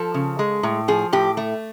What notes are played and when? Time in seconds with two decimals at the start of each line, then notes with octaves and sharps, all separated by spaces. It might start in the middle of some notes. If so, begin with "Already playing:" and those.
Already playing: F3 A4
0.14 C#3
0.39 G#3
0.63 A2
0.88 F3 G#4
1.13 A2 G4
1.37 A3